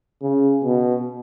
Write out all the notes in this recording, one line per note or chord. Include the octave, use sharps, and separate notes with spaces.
C#3
B2